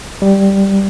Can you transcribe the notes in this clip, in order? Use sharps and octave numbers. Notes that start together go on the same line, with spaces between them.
G3